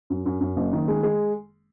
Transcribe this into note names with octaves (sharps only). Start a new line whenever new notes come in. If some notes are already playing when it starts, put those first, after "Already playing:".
F#2
F#2
F#2
F#1
D#3
G#3
G#3